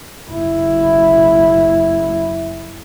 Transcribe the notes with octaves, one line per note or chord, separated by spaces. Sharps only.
F#1 E4